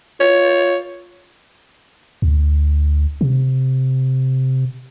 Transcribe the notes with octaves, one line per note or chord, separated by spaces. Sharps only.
F4 C#5
D2
C3